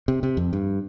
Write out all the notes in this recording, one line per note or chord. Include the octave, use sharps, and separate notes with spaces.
C3
C3
F2
G2